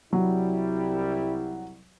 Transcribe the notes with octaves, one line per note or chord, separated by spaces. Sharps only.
C2 F#3 G3 E4